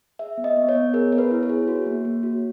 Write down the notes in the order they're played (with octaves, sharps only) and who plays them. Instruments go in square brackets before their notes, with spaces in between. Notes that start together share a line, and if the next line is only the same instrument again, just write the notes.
[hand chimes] G#4 E5
B3
D#5
B3
C#5
B3
G#4 A#4
B3 C#5
B4
E4
C#5
G#4
F#4
A#3
A#3
F#4